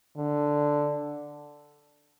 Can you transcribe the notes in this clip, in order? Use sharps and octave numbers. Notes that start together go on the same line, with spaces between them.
D3